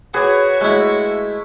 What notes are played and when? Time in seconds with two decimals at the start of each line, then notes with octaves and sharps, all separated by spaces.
0.14 F#4 G#4 B4 C#5 D6
0.61 G#3 A3 E4